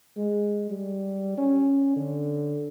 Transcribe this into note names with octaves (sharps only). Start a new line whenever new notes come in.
G#3
G3
C#4
D3